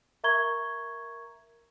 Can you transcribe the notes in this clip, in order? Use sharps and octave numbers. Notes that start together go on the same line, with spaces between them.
A#4 E5 A#5 C#6 G#6 G7